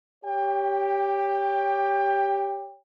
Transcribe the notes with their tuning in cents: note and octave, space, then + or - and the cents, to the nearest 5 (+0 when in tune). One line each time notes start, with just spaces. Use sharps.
G4 +0 C#5 +15 G5 +25